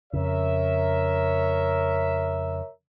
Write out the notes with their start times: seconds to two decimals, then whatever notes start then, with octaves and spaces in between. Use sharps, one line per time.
0.13 F2 C#3 A#4 C#5 E5